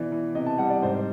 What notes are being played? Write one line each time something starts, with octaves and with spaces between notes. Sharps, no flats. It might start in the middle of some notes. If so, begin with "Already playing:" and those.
Already playing: B2 E3 D5
E3
C3 D#5
A5
G3 F#5
D5
G#2 C5
C5